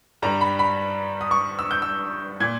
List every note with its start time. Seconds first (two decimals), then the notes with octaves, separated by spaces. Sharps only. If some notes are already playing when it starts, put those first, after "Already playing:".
0.22 G2 G3 A#5
0.41 B5
0.59 B5
1.21 D#6
1.31 C#6
1.59 E6
1.71 G6
1.82 E6
2.40 A#2 G#6